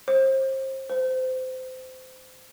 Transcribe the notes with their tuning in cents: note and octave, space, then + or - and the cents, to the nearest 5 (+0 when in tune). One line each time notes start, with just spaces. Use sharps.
C5 +30
C5 -25